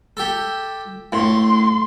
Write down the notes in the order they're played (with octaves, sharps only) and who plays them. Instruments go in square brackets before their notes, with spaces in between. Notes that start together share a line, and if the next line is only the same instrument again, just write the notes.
[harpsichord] G4 A4
[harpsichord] A2 [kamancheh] C6